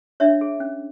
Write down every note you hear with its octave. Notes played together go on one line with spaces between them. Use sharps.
D4 C#5 E5
G#4
C#4